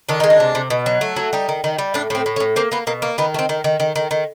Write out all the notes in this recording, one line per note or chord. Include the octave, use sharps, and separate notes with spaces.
D#3 D4
G#3 D#4
D4
C3
C3
B2
F#3
A3
F#3
G3 D#4
D#3
D#3
G3
A2 D4
A2 C4
A2
C#4
A2
A#3 C4
A#3 B3
B2 A#3
A#3
D#3 B3
A3
C4
D#3
D#3
D#3
D#3
D#3